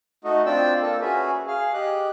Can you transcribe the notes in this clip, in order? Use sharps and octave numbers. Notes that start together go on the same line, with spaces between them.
A3 D#4 F#4 D#5
C4 D4 F4 D5 G5 E6
A#3 A4
C#4 F#4 G#4 B4 E5
G#4 F5
G4 D#5 F#6